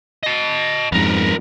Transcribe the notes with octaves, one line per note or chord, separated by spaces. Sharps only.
D#5 A5
F2 G#2 A#4 B4